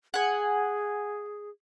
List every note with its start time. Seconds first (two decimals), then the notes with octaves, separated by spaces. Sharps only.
0.14 G#4 F#5 G#5